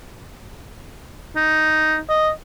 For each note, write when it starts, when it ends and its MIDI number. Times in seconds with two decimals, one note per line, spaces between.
1.36 1.98 63
2.09 2.30 75